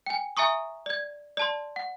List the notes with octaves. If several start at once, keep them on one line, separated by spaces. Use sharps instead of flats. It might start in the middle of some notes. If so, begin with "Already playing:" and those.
G5 G#5
E5 G#5 A#5 C#6 D#6
D5 G#6
D5 A5 C6
F#5